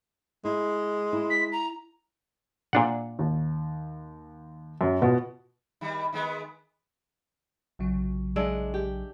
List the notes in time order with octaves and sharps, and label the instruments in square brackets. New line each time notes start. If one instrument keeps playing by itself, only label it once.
[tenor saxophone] G#3 [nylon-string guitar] E4
[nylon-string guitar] E4
[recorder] B6
A#5
[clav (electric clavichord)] A#2 D4 F#5
[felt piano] D#2
F#2
B2 B3 F4
[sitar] D#3 G3
D#3 G#3 B3
[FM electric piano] A#1 C#3 F#3
[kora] G#3 D4 E5
G4